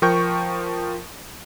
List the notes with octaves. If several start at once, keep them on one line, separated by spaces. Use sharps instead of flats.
F3 A#4 G5 C#6 G6